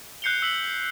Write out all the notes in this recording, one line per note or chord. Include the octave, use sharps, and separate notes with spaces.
F#6 G6 C7 C#7 F7 G7
E6 F#6 B6 F#7